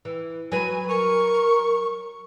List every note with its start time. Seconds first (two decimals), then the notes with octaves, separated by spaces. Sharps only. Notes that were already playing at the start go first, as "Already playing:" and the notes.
0.05 E3
0.52 F#3 B4 G#5
0.89 A#4 C#6